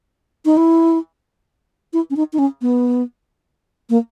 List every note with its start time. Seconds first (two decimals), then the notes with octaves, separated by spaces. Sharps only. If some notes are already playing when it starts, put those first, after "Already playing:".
0.45 D#4
0.57 E4
1.93 E4
2.10 C#4
2.16 D#4
2.33 D#4
2.39 C#4
2.62 B3
3.90 A#3